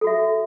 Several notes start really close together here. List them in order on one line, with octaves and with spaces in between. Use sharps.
A4 F#4 E5